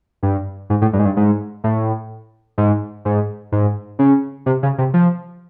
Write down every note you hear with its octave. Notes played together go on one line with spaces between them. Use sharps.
G2
G#2
A2
G2
G#2
G2
G#2
A2
G#2
G#2
G#2
C#3
C3
C#3
C3
F3